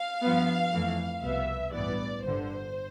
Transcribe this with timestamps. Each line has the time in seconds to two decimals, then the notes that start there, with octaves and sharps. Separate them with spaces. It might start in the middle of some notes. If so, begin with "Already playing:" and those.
Already playing: F5
0.23 G2 F3 B3
0.73 F2 E3 A3
1.23 C2 B2 B3 E5
1.74 A1 G2 E3 B3 D5
2.24 G1 G2 D3 C5